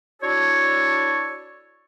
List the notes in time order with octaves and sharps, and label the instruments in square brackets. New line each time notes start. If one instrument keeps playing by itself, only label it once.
[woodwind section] D4 E4 F#4 A4 C#5